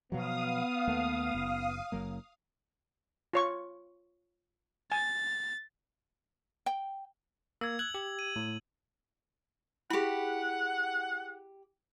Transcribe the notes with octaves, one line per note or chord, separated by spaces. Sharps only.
B2 F3 F#3 B3 F5 D#6
D#2 A3 A#3
F#1
F#1 F#3 A#3
F4 C#5 C#6
G#5 A6
G5
A#3 E6 G#6
E6 F#6 G#6 F#7
G4
D#7
A2
E4 G4 G#4 F#5 B5